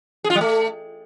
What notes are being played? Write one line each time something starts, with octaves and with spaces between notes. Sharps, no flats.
G#4
F4
G3
A3